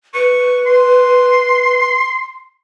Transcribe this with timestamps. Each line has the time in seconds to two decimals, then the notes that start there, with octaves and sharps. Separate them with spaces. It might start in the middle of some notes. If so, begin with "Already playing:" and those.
0.15 B4 C#6
0.67 C6